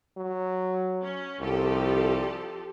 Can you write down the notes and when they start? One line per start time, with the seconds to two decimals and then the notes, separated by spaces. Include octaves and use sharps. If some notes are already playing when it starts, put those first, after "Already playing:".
0.17 F#3
1.01 C#4
1.40 C2 F3 G4 A4